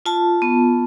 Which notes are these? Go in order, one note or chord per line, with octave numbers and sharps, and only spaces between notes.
F4 A5
B3